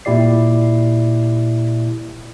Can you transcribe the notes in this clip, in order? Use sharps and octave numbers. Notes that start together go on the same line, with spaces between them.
A#2 E4 G4 D5 C7